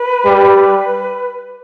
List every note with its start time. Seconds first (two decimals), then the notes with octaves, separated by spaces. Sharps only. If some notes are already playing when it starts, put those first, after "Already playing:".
Already playing: B4
0.25 G3